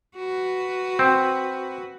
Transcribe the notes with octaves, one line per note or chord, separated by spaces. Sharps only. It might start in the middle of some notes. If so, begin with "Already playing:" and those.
F#4 B4
C4